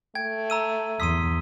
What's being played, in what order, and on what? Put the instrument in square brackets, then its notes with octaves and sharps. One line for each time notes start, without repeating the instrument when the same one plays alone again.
[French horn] A3 [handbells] G5 [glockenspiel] G#6
[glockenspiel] A#5 E6 D#7
[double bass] E2 [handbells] C6 D#6 B6 [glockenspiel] E6 D#7